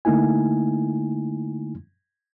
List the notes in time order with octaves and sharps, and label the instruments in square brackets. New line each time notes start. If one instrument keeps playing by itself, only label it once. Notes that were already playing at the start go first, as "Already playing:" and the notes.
[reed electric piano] D3 A3 A#3 D#4 E4 G#5